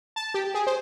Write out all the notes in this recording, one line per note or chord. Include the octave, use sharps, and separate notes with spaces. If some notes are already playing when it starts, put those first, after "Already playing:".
A5
G4
G#4
C5